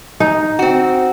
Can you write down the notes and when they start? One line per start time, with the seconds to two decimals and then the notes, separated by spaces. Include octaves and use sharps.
0.20 D#4
0.59 C4 F#4